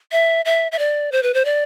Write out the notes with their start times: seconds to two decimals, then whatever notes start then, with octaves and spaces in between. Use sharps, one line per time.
0.12 E5
0.45 E5
0.72 E5
0.79 D5
1.12 C5
1.23 B4
1.34 C5
1.45 D5